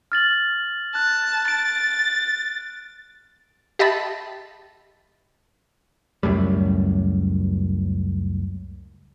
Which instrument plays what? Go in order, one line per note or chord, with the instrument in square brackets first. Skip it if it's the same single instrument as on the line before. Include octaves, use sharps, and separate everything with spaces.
[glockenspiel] F6 A6 F#7
[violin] A5 [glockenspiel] F#6
[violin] A6 [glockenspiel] D7
[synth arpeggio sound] G4 D#5 E5 A5 B5
[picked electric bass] C#2 F#2 A2 G3